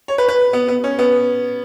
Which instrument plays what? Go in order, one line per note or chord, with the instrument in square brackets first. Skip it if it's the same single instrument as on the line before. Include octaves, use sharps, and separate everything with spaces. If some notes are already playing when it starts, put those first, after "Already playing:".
[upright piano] C#5
B4
B4
B3
B3
C#4
B3